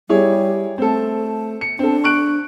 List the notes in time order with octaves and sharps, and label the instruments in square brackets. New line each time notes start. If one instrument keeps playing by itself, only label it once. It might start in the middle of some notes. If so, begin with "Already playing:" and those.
[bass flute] G3 [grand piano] E4 G#4 C#5
[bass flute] A3 [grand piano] C4 A4
[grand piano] C#7
[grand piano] C4 A4 [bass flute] D4
[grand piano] C#6 F#6 D7